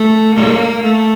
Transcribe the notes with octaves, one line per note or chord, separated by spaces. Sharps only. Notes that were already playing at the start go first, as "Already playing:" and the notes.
Already playing: A3
A#3
A3